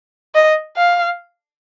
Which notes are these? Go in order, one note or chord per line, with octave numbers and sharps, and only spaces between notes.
D#5
F5